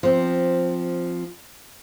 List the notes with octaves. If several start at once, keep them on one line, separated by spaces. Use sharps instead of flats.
F3 C4